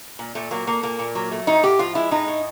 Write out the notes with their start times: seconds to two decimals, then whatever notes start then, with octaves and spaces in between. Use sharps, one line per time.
0.19 A#2
0.35 A#2 A3
0.51 F#3 A#3
0.67 A3 A#3
0.83 A#2 A#3
0.99 A#2
1.15 F#3
1.31 A3
1.47 A2 D#4
1.63 A2 G4
1.79 F3 F4
1.95 G#3 E4
2.11 A2 D#4
2.28 A2